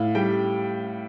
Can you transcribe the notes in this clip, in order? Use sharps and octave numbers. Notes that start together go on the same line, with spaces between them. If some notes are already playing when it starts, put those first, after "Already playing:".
Already playing: A2 F5
G3 G5